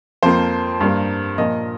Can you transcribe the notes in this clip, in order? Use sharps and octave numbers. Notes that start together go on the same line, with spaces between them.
F2 F3 A#3 C5
G2 G3 A#3
A#2 F3 A#3 D#5